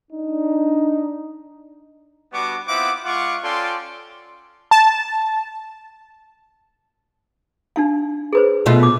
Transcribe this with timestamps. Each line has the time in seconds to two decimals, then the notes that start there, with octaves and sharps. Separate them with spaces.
0.12 D4 D#4
2.33 G3 B3 D4 F#4 C#6 D6
2.68 B3 C4 E4 F4 F#5 D6
3.05 G#3 F4 F#5 C#6 D6
3.43 C#4 F4 A4 D5 G5 C6
4.71 A5
7.76 D4 D#4 F5
8.33 G#4 B4 C5
8.66 B2 A3 F4
8.83 D6